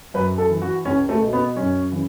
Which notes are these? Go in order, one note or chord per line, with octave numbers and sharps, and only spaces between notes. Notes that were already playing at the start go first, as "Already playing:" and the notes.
F#2 B4
A4
E3
F#4
C#2 C#4
A3
B2
B3
F#2 C#4
C#3 E3